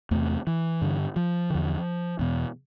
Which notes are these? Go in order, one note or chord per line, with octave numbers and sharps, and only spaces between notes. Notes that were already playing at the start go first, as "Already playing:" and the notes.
E2 C3 A3
E3
G2 D3
F3
E2 D3
E2 B2